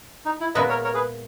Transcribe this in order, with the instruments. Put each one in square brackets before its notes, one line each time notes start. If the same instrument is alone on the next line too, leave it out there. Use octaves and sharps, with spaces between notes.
[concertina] D#4
E4
[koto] A#2 G#3 B3 E4 [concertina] B4 D#5
[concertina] A#4 C#5
A#4 C#5
G#4 B4